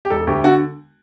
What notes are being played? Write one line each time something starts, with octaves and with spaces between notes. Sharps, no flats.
G4
E1 A4
D2 G4
D3 F#4